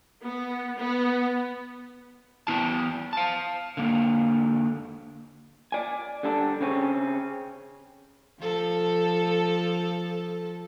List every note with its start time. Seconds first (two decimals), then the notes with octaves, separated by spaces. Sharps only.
0.24 B3
0.78 B3
2.47 B3 E4 A5
3.13 F5 A5
3.77 D3 A#3
5.72 D5 G#5
6.23 D3 G3 D4 A4
6.61 C#3 C4 C#4
8.40 F3 A4